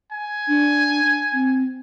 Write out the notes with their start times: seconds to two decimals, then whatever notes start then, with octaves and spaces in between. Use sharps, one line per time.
0.12 G#5
0.48 D4
1.33 C4